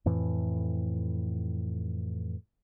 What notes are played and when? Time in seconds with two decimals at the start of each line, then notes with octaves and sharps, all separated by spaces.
0.06 F2 A2 E3